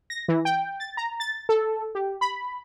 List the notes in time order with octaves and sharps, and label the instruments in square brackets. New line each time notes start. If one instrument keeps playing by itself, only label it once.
[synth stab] A#6
E3
G5
A6
A#5
A6
A4
G4
B5